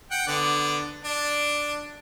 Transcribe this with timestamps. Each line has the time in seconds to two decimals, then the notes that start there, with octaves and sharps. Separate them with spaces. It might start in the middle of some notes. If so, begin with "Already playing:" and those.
0.11 F#5 G5
0.27 D3 B3 D5
1.04 D4